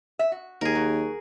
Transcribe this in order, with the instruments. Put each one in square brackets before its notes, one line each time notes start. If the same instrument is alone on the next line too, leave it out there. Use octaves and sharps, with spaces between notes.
[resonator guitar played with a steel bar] E5
F#4
[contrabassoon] D#2 [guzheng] G#4 A#4
[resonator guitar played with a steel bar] F#3